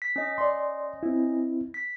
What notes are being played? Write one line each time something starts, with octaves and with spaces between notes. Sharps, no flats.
B6
C#4 D#5
D5 C6
C4 E4
B6